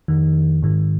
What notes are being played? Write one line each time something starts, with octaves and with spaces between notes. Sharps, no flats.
F2 D#3
G#2 D#3